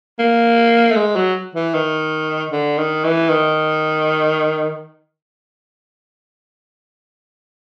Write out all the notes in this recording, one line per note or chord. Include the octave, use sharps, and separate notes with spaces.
A#3
A3
G#3
F#3
E3
D#3
D3
D#3
E3
D#3